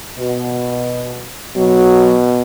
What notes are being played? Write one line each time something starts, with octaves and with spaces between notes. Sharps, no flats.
B2
B2 F#3